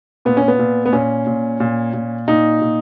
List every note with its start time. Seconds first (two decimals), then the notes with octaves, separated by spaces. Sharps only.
0.25 A#2 B3
0.37 C#4
0.48 B3
0.59 A#2
0.85 B3
0.93 A#2 C#4
1.27 A#2
1.60 A#2
1.93 A#2
2.28 A#2 D#4
2.61 A#2